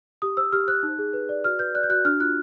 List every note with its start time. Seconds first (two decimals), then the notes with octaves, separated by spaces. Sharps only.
0.22 G4 D#6
0.37 C5 E6
0.52 G4 F6
0.68 C5 F#6
0.83 D#4
0.99 G#4
1.13 B4
1.29 D5
1.44 F#4 F6
1.59 B4 G6
1.75 D5 F#6
1.83 G6
1.90 F#4 F#6
2.05 D4 F6
2.20 F4 F#6